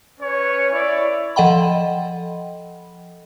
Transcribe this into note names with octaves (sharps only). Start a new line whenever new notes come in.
C#4 B4 C#5
E4 C#5 D5
F3 A4 D#5 F#5 G5 B5